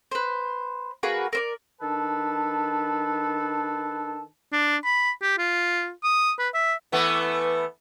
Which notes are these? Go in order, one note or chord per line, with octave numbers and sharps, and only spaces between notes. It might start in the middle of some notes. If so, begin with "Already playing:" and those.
B4 C5
A#3 F#4 G#4 B4
A#4 C5 D5
D#3 D4 A4 B4 A5
D4
B5
G4
F4
D#6
B4
E5
E3 A3 B3